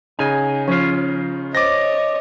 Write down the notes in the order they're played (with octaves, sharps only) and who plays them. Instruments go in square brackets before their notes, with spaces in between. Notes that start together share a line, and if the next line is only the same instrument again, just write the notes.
[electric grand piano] C#3 D#4 [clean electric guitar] G#5
[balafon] F3 [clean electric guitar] C#4 F4
[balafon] C5 [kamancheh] C#5 D#5 [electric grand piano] D6 A6 A#6